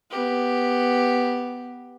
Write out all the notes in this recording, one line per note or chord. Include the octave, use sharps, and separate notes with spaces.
B3 G4